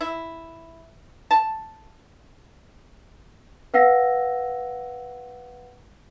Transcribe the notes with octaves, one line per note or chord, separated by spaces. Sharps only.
E4
A5
B4 F5 F#5 E6 A#6